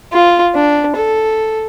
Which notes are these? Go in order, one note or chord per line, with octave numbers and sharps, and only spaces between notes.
F4
D4
A4